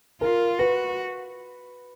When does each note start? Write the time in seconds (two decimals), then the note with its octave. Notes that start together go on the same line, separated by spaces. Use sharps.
0.21 F4 A#4
0.59 F#4 B4